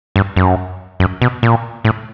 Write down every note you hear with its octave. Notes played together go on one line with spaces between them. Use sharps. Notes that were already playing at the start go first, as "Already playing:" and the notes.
G2
F#2
F#2
B2
A#2
A2